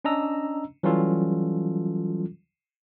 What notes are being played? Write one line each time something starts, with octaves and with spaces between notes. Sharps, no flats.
C#4 D4 D#5 A#5 E6
E3 F#3 G3 C#4 F4 A4